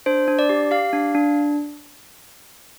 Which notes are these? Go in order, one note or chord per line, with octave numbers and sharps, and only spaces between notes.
D4 C5
D4
D5
G4
G4 F5
D4
D4